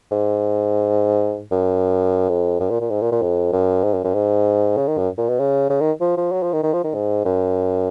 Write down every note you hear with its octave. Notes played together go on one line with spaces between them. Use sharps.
G#2
F#2
F2
F#2
A#2
A#2
G#2
A#2
A#2
F2
F#2
G#2
F#2
F#2
G#2
C#3
D#3
F#2
A#2
B2
C#3
C#3
D#3
F3
F3
F#3
F3
D#3
D#3
F3
D#3
G#2
F#2